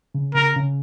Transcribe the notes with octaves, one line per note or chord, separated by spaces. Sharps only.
C#3
C#3 A#4
C#3